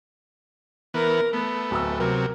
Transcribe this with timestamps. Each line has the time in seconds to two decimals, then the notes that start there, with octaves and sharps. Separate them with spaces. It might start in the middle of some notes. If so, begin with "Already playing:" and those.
0.94 E3 B3 A#4
1.33 A3 B3
1.71 D1 A#5 E6
2.00 C3 F#3 A#4